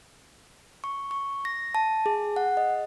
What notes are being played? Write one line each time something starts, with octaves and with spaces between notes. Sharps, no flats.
C#6
C#6
A#6
A5
G#4
F#5
D#5